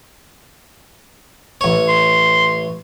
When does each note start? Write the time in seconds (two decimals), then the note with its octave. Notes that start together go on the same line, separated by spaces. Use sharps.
1.61 A1 C#5
1.89 C6